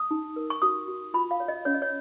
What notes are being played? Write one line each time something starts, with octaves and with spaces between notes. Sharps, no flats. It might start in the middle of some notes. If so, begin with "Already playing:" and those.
Already playing: D#6
D#4
A#4
C#6
F#4 D#6
F#4
F4 B5
F5
C#5
D#5
C#4 C#5
D#5
C#5